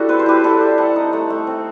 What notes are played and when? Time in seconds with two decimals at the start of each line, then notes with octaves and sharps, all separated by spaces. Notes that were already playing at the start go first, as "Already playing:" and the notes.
Already playing: G3 E4 F#4 A4
0.09 C4 B4
0.19 C5
0.26 E4 G4 B4
0.44 G3 A4 C5
0.61 G3
0.78 C4 F#5 A5
0.96 D#4
1.13 A3
1.30 A3
1.47 C4